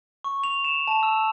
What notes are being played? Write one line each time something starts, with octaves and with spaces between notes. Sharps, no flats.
C#6
F7
E7
A5
E6